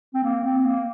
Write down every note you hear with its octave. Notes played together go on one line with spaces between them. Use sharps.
C4
A#3
C4
A#3